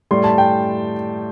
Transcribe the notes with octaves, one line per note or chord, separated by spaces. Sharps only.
A2 G3 C6
A5
G5